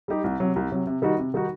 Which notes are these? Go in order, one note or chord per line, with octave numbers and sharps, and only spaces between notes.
G3 D#4 G4
C2
C3 F#3
C2
C3 F#3
C3
D#3 G3 D#4 F#4
C3
D#3 G3 D#4 F#4